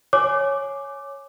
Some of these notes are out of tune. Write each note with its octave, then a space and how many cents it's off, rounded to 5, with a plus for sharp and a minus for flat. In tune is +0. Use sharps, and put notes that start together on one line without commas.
C#5 +0 G#5 +10 D6 +0